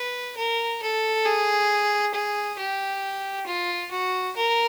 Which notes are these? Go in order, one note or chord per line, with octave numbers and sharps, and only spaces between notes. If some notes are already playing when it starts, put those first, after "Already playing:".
Already playing: B4
A#4
A4
G#4
G#4
G4
F4
F#4
A#4